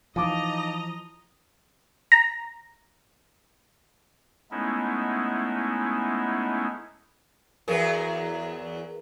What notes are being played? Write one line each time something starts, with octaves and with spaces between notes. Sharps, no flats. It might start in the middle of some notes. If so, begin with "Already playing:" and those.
E3 F3 D#4 D#5 F5 A5 A#5 D6
A#5
G#3 A3 B3 C#4 D#4 E4
E2 F#3 G#4 A#4 B4